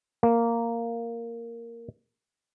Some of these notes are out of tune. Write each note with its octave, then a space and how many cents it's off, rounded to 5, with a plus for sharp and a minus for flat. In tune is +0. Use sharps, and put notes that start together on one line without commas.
A#3 -5